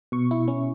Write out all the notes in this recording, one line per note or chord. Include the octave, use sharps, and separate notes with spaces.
B2 C#6
E4
C#4